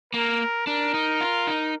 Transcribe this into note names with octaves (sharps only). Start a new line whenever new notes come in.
A#3 A#4
D4 A#4
D#4
F4
D#4